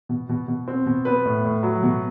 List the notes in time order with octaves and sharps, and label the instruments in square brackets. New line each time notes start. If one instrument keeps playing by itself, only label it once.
[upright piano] B2
B2
B2
C4
B2
B3 B4
A2
A2
F#3
B2